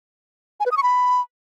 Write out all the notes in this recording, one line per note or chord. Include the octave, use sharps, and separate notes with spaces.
G#5
B4
D#6
C#6
B5